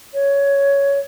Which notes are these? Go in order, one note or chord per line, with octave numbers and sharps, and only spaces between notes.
C#5